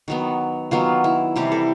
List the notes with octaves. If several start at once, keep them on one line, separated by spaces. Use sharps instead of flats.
D#3 F#3 B3
D#3 F#3 B3 F4
E4
C3 E3 G3 G4
A4